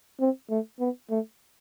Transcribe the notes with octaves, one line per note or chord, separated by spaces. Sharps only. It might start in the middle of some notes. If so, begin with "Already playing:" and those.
C4
A3
B3
A3